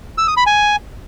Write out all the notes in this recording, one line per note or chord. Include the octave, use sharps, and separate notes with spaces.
E6
D#6
B5
G#5